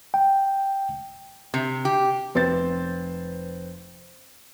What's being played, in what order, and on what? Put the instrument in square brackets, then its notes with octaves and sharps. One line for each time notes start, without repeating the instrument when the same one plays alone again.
[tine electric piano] G5
[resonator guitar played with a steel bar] C3
G4
[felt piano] F1 C4 B4 C5 A6